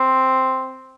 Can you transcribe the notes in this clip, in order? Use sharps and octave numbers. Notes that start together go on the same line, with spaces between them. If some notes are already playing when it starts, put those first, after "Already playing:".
Already playing: C4